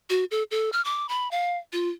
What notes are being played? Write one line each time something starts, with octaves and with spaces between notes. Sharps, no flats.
F#4
A4
A4
F6
D6
B5
F5
F4